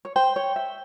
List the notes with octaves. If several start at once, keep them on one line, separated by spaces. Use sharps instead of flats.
C#5
C5 G5
C#5
E5